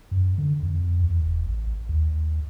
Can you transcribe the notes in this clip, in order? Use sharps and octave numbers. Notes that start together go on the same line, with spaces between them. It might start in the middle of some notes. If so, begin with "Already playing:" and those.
F#2
D3
F2
E2
F1
A1
D#2